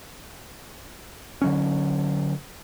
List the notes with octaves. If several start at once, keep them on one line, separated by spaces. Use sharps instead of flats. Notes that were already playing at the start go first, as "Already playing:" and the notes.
D3 F#3 C#4